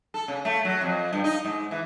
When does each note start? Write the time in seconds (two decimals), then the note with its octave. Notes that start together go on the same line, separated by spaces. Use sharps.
0.14 A4
0.28 C#3
0.45 A3
0.65 F#3
0.81 F2
1.13 G2
1.24 D#4
1.45 G#2
1.71 E3